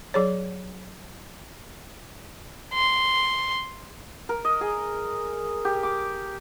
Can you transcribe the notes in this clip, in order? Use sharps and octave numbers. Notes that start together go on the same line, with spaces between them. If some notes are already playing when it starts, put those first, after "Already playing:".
F#3 G#4 C#5
C6
A#4
D#5
G#4
G4
D6